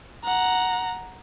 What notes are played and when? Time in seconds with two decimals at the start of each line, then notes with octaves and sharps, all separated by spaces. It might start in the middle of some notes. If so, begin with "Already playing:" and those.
0.24 F#5 A#5